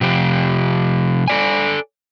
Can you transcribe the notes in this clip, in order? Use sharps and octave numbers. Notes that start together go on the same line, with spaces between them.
C3 F3 G4
A4 D5 G#5